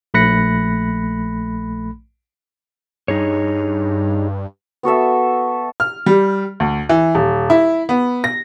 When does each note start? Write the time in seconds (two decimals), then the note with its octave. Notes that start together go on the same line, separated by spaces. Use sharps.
0.14 A#1 A3 B5 F#6 A#6 C#7
3.08 G2 D#4 G#4 C#5
4.83 B3 F#4 A4 E5
5.80 F6
6.06 G3
6.60 D2
6.89 E3
7.15 D#1
7.50 E4
7.89 B3
8.24 A#6